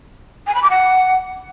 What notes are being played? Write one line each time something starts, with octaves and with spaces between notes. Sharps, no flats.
G#5
B5
D6
F#5